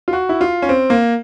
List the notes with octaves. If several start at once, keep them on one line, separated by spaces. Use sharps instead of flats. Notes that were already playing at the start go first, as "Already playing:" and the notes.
F4
F#4
E4
F4
C#4
C4
A#3